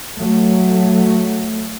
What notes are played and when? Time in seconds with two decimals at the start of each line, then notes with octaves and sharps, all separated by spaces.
0.17 F#3 A3